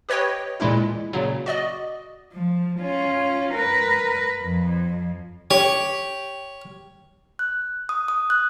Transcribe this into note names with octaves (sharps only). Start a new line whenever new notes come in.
G4 B4 C#5 D#5 G5
A#2 E3 G#3 D4 E4
A#2 C#3 F#3
F#4 D5 D#5
F3
C#4 F4
A#4 B4
F2
G4 C#5
F#6
D#6
D#6
F#6